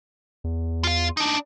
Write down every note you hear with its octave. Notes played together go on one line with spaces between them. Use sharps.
E2
F4 F5
D4 D#4